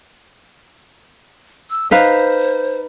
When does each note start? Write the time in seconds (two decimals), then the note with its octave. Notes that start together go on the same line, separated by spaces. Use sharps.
1.70 E6
1.91 D#4 B4 C5 F5